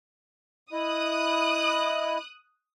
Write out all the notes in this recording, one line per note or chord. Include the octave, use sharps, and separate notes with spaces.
E4 D#5 D#6 F#6